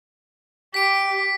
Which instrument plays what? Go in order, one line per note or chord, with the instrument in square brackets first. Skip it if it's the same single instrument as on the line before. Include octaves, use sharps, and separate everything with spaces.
[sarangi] G4 [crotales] B6 D7